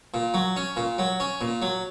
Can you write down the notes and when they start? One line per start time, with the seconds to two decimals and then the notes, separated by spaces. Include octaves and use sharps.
0.14 A#2
0.34 F#3
0.56 C#4
0.77 A#2
0.98 F#3
1.20 C#4
1.41 A#2
1.62 F#3